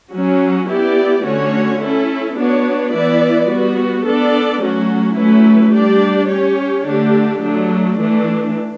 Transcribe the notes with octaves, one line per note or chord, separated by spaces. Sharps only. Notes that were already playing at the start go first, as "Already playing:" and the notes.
F#3 C#4 F#4
B3 E4 G4 D5
D3 A3 C#4 F#4 C#5
C#4 E4 A4
B3 D4 F#4 C#5
E3 B3 E4 B4 D5
G3 B3 F#4
B3 D4 A4 D5
F#3 A3 C#4 F#4
F#3 A3 C#4 E4 B4
G3 D4 G4 D5
C#4 G4 C#5
D3 A3 D4 G4
F#3 A3 D4
E3 A3 D4